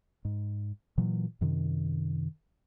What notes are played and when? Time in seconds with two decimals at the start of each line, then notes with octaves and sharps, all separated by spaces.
0.25 G#2
0.98 A#2 E3 F#3
1.41 F#2 C3 D#3